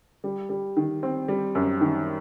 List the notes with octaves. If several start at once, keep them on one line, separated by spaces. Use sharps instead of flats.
G3
G3
D#3
C4
G3
F#2
D#3